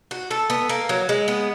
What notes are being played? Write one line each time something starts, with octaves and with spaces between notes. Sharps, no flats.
F#4
A4
B3
A#3
F#3
G#3
B3